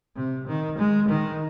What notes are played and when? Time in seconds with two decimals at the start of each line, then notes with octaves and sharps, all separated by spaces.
0.16 C3
0.47 D#3
0.78 G#3
1.08 D#3